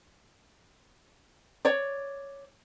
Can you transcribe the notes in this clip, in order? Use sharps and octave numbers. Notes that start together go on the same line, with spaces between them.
C#5 D5